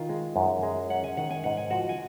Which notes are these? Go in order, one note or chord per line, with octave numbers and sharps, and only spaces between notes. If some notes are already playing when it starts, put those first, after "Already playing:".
Already playing: D#3 F4
G#3
F#2
G#3
C#4 F#5
G#5
D#3 F#5
G#5
G#2 F#5
G#5
F3 F#4 F#5
G#5